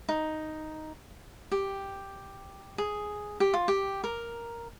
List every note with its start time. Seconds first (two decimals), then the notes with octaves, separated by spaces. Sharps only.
0.09 D#4
1.52 G4
2.78 G#4
3.40 G4
3.54 F4
3.68 G4
4.04 A#4